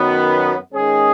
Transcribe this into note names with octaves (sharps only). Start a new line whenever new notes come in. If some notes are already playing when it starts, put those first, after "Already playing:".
Already playing: F#2 D#3 F#3 B3
D#3 G#3 C#4 G#4